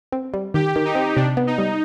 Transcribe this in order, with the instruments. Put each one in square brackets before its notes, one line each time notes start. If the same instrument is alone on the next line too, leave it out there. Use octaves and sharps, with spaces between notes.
[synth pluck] C4
G3
[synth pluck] D#3 [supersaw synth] G4
[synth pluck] D#3
[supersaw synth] D#4
[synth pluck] C4
[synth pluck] C3 [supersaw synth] D4
[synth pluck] B3
[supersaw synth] D#4
[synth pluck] G3